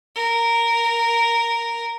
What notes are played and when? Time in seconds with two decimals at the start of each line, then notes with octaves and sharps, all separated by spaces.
0.15 A#4